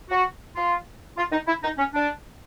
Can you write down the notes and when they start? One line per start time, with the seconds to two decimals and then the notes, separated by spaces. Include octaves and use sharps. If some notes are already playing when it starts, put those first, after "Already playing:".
0.10 F#4
0.56 F4
1.17 F4
1.32 D#4
1.47 E4
1.63 D#4
1.78 C#4
1.94 D4